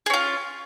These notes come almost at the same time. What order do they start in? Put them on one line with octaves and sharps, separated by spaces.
G#4 C#4 F4